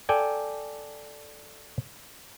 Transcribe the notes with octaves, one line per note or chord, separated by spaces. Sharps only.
A4 D5 G5 G#5